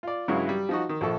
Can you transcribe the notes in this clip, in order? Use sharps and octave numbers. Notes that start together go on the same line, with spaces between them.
F4 D5
G2 C#3 F#3 G#3 E4 F#4
G3
F3 D#4 F#4
D#3
A#1 F3 A4 C#6